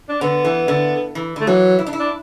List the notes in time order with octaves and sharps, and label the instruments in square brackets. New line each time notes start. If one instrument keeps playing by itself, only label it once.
[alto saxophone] D4
[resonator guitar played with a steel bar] D3 [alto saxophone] B3
[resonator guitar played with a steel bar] E3
D3
E3
[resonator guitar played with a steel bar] D3 [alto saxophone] A3
[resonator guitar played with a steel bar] E3 [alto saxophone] F#3
[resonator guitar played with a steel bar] E4
D4
E4
[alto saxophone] D4